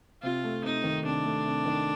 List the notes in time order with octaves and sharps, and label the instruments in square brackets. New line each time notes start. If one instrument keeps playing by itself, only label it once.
[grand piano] C3 [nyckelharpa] F4
[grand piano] A3
[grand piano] C3 [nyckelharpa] D#4
[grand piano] D#3
[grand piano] C3 [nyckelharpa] D4
[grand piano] A3
C3
D#3